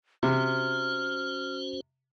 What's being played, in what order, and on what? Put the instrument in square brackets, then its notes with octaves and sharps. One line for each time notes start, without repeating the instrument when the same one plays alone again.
[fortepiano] C3 [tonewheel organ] C#4 F#4 C5 [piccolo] F6